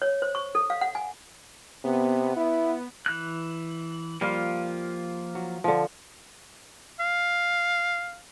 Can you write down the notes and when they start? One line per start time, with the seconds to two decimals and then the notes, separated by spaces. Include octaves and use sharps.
0.02 C#5
0.22 C5
0.35 C#6
0.55 A4
0.70 F5
0.81 F#5
0.95 G#5
1.84 C3 B3
2.36 E4
3.06 E3 F#6
4.21 F3 G3 A#3 F4 F5
5.35 F#3
5.64 D3 F3
7.00 F5